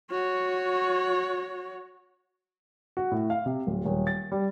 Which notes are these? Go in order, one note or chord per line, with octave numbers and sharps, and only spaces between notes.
F#4 C#5
F#4
A2
F5
C3
D1
D#1
A6
G3